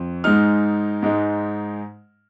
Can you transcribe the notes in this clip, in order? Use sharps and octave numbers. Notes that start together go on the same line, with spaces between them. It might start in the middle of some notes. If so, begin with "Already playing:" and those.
Already playing: F2
G#2 G#3 D#4 F6
G#2 G#3 D#4